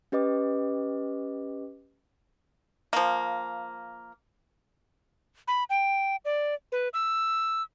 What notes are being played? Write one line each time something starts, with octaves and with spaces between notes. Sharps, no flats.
C#4 G4 B4 D#5 D6
F3 A#3
B5
G5
D5
B4
E6